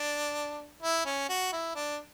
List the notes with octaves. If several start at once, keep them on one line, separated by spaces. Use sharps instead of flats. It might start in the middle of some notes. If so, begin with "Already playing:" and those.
Already playing: D4
E4
C#4
F#4
E4
D4